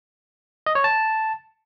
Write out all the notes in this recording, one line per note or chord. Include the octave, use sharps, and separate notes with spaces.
D#5
C#5
A5